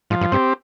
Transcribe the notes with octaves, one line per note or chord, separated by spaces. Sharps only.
G#2 F3
G2
G2 C4 G4